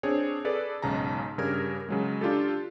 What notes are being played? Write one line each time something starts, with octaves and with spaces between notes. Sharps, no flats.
C4 D4 G#4 C#5
G#4 A4 B4 D5
B1 G#2 C#3 A5 A#5
G2 C#3 G3 A#4 F6 G#6
C#3 F#3 G#3
D4 F4 G4 A4